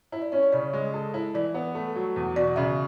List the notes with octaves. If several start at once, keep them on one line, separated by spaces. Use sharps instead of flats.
E4 E5
D5
C#4 C#5
C#5
C#3 D5
G#3
A4
E4
E3 D5
B3
A3
F#3
E2
B2 D5
C#3 E5